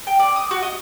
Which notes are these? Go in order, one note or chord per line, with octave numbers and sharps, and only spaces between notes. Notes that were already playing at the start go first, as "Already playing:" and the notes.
G5
D5
D#6
F#4
D#5